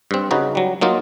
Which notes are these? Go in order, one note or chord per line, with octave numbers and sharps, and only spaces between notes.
G2 C4
C#3 D#4 F#4 B4
F#3 G3
F#3 A#3 D#4 F4